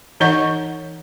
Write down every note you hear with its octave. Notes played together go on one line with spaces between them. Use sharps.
E3 D#4 C#5 D#5 F#5 C#6